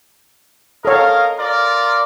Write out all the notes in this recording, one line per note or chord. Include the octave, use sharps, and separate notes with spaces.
A4 A#4 C#5 D#5 F5
F4 A#4 D5